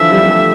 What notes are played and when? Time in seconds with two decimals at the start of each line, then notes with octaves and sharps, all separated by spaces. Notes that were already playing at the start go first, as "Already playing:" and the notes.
Already playing: D3 E3 F3 E5
0.11 G3
0.23 G3
0.31 A3